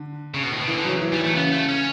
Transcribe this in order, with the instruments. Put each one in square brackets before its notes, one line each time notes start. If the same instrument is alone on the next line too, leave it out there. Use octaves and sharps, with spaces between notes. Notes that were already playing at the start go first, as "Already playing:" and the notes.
Already playing: [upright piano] D3
[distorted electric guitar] C#3
B2
A2
B2
[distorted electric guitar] C#3 [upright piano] E3
[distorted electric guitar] D3
[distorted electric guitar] C#3 [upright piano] F#3
[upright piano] E3
[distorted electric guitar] G3
[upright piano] E3
[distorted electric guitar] A3
[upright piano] C#3 [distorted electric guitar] B3
[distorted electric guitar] A3
C#4